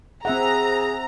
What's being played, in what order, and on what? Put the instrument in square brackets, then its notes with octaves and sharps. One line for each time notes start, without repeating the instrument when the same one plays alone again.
[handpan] C4 E5 F#5 [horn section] G#4 [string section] A#5